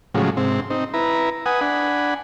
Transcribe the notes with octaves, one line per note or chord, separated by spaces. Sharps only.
A2 C#3 F3 F#3 G#3
G#2 C3 C4
C4 D#4
E4 B4 A#5
B4 F#5 G#5 D#6
D4 F#5 G#5 B5